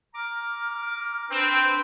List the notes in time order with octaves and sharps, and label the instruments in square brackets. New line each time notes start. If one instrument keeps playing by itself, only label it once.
[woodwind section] A#5 D6 F6
[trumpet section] C4 [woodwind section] D4 B4